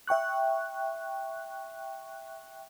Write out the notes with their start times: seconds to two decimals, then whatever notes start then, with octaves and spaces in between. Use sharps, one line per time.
0.07 E5 G5 C#6 F#6